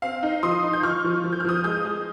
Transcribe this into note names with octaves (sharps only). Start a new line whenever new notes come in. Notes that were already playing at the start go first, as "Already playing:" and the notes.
C4 F5
D#4
F3 C6 D#6
D#4
G6
F3 C#6 F6
F3
F3
G6
F6
F3 D#6 G6
G#3 D#6 G6
G#3